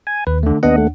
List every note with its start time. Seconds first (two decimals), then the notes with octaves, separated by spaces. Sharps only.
0.07 G#5
0.27 D#2 B4
0.43 D3 A3
0.63 D#2 B3 D4 D#5 F#5
0.78 A3